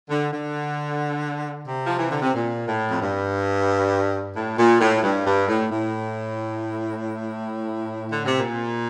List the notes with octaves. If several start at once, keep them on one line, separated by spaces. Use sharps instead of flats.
D3
D3
C3
F3
E3
D3
C3
A#2
A2
F2
G2
A2
A#2
A2
G2
G2
A2
A2
D3
C3
A#2